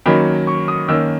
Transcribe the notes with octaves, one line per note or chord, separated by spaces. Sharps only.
D#3 F#3 A#3 C#4 B5
C#6
D#6
D#3 A#3 C#4 E6